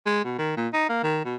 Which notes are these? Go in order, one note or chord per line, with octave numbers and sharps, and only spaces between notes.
G#3
B2
D#3
A#2
D#4
A#3
D#3
B2